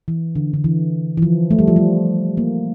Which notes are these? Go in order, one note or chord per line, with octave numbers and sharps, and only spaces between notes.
E3
D3
D3
E3
E3
F3
A3
G3
F3
G3
A#3